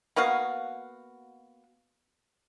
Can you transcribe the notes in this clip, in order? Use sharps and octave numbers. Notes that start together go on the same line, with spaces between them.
A#3 B3 F#4 F5